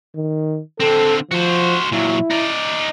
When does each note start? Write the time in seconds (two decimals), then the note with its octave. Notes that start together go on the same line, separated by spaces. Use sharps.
0.16 D#3
0.80 D3 C4 A4
1.31 F3 F#4 C5
1.92 A#2 F#3 E4
2.31 D#4 D5